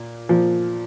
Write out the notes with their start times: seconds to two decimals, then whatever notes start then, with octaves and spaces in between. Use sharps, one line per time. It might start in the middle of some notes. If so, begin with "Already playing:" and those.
Already playing: A#2
0.29 A#2 F3